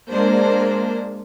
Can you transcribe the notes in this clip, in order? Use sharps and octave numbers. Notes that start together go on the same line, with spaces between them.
G#3 A#3 D4 C5